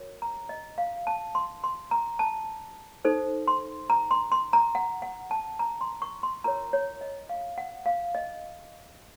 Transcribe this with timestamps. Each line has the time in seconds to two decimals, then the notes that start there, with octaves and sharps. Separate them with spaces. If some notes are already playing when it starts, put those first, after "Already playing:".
Already playing: F#4 A#4 C#5
0.22 A#5
0.49 D#5
0.78 F5
1.07 A5
1.35 C6
1.64 C6
1.91 A#5
2.19 A5
3.05 D#4 A4 C5
3.48 C6
3.90 A#5
4.11 C6
4.32 C6
4.53 A#5
4.75 F#5
5.02 F#5
5.31 A5
5.59 A#5
5.81 C6
6.02 C#6
6.23 C6
6.44 F4 A#4 C#5 A#5
6.73 C#5
7.01 D#5
7.29 F5
7.58 F#5
7.86 F5
8.15 D#5